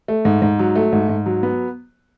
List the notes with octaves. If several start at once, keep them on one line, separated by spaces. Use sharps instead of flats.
A3
G#2
G#2
F#3
A3
G#2
G#2
F#3
B3